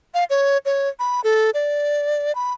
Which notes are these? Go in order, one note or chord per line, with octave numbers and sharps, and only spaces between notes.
F5
C#5
C#5
B5
A4
D5
B5